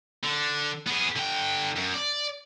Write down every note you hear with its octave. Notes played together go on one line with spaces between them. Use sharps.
D3
B3 G#4
D3 G5
F#2
D5